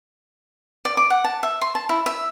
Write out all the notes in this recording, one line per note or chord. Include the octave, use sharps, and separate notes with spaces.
D5
D6
F#5
A5
E5
C6
A5
E4
E5